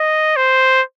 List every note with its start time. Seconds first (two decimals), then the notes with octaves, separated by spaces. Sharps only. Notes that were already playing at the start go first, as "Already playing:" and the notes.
Already playing: D#5
0.36 C5